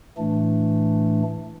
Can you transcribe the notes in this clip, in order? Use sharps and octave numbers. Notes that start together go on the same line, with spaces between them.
A2 E3 A3 D4